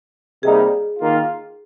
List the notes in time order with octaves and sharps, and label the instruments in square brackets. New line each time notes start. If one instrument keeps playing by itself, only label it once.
[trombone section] C3 G3 A#3 D#4 [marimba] G#4
[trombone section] D#3 A#3 F4